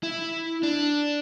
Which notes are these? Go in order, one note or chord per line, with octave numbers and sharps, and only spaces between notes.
E4
D4